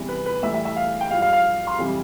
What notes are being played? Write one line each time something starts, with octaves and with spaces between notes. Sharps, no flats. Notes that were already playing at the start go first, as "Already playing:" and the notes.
Already playing: E2 C3 E3 G3
B4
B4
A2 E3 G3 E5
E5
E5
F5
G5
G2 F3 F5
F5
F5
C6
F2 C3 E3 G3